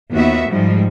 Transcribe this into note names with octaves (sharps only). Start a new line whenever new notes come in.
D#2 B3 F4 F#4 E5
G#2 F3 G3